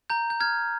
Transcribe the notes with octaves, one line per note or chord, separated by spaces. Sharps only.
A#5 G6
G6
F6 G#6